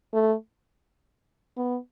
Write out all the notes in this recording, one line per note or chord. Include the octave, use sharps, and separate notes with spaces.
A3
B3